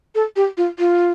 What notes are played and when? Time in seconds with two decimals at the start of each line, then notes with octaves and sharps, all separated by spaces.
0.15 A4
0.36 G4
0.57 F4
0.79 F4